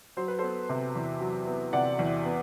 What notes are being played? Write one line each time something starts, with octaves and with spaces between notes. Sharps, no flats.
F#3 C5
B4
B3 A4 C5
C3
E2
F#3
B3
C3 D5 F#5
E2
B3